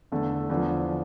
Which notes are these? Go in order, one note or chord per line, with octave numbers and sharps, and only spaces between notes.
E2 D3 A3
E2 D3 F3